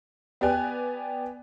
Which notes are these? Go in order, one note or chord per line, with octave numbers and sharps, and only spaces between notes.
B3 G4 D5 G#5 F#6